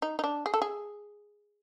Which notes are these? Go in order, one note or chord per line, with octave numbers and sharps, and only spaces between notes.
D#4
D#4
D4
G#4
A4
G#4